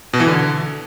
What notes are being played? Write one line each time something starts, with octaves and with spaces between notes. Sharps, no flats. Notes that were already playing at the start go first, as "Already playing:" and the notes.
B2
E3
D3